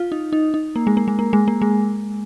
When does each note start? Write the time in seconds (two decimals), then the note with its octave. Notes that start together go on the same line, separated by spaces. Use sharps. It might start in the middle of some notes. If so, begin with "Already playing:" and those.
Already playing: F4
0.12 D#4
0.33 D#4
0.54 D#4
0.76 A#3
0.87 G#3
0.97 A#3
1.08 G#3
1.19 A#3
1.33 G#3
1.48 A#3
1.62 G#3